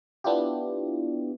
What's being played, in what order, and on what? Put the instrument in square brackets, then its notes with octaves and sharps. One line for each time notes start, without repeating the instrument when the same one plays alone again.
[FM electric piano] B3 D4 E4 F4 G4